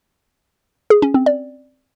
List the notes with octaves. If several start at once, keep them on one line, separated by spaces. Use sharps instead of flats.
G#4
C#4
C4
D5